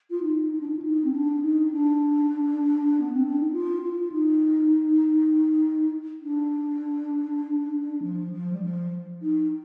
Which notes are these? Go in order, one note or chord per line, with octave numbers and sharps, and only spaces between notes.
F4
D#4
D#4
D4
D#4
F4
D#4
C4
D4
D#4
D4
B3
C4
D4
D#4
F4
F4
D#4
D4
F3
F3
G3
F3
D#4